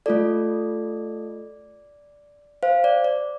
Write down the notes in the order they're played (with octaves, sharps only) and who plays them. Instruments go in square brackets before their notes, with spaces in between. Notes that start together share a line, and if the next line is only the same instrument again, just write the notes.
[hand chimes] A3 F4 A4 D5
C5 F5
D5
D5